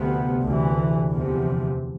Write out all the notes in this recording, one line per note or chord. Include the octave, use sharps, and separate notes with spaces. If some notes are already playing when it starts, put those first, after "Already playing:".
Already playing: D2 C3 F3 B3
D2 C3 E3
E2 C3 F3